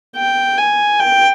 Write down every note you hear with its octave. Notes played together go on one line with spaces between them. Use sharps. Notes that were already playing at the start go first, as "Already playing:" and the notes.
G5
G#5
G5